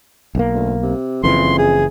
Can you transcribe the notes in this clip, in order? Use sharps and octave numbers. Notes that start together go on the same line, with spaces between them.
B1 D#3 A#3
D2
C3
F#1 F2 C#3 E3 C6
G#4